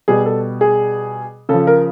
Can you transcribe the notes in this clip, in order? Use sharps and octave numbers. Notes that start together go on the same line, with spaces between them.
B2 G3 G#4
A4
G#4
C#3 F3 A4
A#4